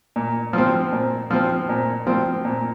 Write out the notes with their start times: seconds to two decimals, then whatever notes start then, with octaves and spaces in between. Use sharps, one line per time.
0.16 A#2
0.53 F3 C4
0.92 A#2
1.31 F3 C4
1.69 A#2
2.07 F3 C4
2.45 A#2